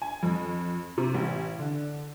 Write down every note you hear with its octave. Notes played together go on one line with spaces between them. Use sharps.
G#5
F2
C3
A1
D3